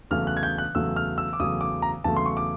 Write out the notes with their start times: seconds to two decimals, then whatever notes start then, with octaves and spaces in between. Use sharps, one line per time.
0.11 E2 C#3 F#3 A3 F6
0.27 F#6
0.37 G#6
0.43 G6
0.58 F#6
0.75 E2 C#3 F#3 A3 E6
0.96 F6
1.18 E6
1.33 D6
1.39 E2 C#3 F#3 A3 D#6
1.61 D6
1.82 A#5
2.04 E2 C#3 F#3 A3 A5
2.16 C6
2.26 C#6
2.37 D6